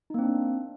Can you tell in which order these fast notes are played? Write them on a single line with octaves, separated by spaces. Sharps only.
D#4 A#3 C4 D4